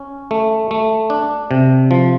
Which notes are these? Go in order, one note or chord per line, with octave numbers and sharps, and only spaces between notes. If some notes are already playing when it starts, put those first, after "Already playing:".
Already playing: C#4
A3
A3
D4
C3
F3